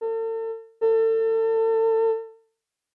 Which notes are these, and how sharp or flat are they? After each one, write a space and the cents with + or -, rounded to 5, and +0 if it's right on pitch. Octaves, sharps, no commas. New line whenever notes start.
A4 +40
A4 +35